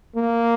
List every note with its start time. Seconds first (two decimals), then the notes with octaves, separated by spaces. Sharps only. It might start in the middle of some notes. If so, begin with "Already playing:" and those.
0.15 A#3